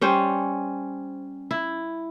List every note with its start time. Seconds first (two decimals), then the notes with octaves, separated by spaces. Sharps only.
0.01 G3 C#4 C5
1.51 E4